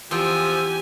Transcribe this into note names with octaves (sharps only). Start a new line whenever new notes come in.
E2 F3 C4 G4 G5 G#5 E6